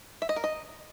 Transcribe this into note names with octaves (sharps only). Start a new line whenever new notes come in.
E5
D#5
A#4
D#5